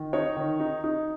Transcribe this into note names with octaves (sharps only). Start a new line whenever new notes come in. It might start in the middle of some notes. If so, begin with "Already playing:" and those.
Already playing: D#3
D#4 C#5
D#3
D#4
D#4